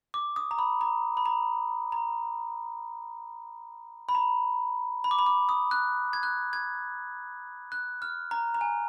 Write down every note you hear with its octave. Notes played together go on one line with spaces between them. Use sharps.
D6
D#6
A#5
B5
A#5
B5
A#5
A#5
B5
A#5
B5
D6
B5
D6
D#6
F#6
G#6
F#6
G#6
F#6
F6
A#5
A#5
G#5